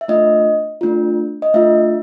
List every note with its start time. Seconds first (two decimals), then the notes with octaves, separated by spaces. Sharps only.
0.01 E5
0.08 A3 D4 F4 D#5
0.81 A3 D4 F4
1.42 D#5
1.54 A3 D4 F4 E5